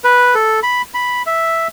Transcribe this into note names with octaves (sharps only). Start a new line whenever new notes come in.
B4
A4
B5
B5
E5